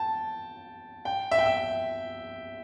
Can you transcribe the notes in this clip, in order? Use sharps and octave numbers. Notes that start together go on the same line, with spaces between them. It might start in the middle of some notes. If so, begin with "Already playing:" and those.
Already playing: G5 A5
G5
E5
G5
E5